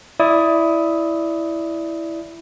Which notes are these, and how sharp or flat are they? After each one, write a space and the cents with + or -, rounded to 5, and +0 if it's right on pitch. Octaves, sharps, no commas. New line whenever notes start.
E4 +0 D5 +0 D#6 +15